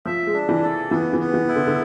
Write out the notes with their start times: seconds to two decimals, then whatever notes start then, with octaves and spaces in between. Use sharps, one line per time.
0.06 F3 E5
0.27 G#3
0.34 D4
0.49 E3
0.63 A4
0.91 E3 B3
1.13 E3
1.19 B3
1.34 E3
1.48 E4
1.56 D3
1.67 D3